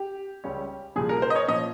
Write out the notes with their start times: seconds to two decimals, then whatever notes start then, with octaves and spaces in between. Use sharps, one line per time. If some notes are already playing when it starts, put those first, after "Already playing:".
Already playing: G4
0.44 C#2 C#3 G3 C#4
0.96 C2 A#2 F3 G#4
1.09 A#4
1.22 C5
1.30 D#5
1.35 C#5
1.48 A#2 F3 D#5